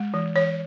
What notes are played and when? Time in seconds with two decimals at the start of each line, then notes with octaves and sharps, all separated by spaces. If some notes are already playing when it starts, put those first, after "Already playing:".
Already playing: G#3
0.14 E3
0.35 E3 C#5